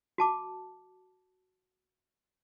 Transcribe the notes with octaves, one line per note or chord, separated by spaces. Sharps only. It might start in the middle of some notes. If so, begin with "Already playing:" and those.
F#4 A5 D6